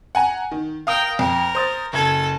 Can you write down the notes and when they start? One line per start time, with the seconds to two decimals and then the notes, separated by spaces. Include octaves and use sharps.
0.15 F#5 G#5 A#5
0.51 D#3
0.87 A#4 F5 G5 D#6
1.19 F2 A#4
1.55 C5 D#6 A6
1.93 F#1 A4 G#6